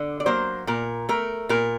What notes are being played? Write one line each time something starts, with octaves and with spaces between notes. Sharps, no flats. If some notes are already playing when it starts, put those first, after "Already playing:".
Already playing: D3
D5
F#3 A#3 C5
A#2 A#4
A3 A#4
A#2 A#4